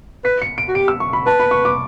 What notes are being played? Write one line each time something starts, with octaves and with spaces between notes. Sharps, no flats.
B4 B6
C#7
D7
F#4
G4 D7
E6
C#6
B5
B4 A5
B5
C#6
D6